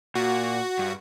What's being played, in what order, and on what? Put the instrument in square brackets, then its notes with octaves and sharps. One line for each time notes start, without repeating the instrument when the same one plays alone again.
[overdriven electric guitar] A#2 [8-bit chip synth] F#4
[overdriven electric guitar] G2